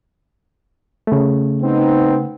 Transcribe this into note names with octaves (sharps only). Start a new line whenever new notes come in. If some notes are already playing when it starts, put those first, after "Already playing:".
C#3 A3
B3 C4 D#4